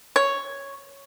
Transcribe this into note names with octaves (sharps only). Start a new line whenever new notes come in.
C#5